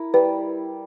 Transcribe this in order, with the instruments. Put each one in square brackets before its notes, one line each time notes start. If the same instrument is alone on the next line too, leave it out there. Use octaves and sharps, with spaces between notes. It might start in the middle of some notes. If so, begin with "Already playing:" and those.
Already playing: [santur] E4 A#4
[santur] G3 [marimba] B4